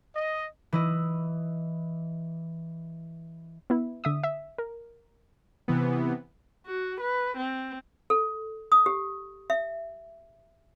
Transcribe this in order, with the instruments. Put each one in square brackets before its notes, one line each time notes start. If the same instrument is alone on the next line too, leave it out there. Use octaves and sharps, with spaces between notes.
[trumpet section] D#5
[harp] E3 E4 D#5
[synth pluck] B3 E4
D3 E5 D#6
E5
A#4
[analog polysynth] C3 E3 B3
[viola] F#4
B4
C4
[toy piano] A4
D#6
G4
E5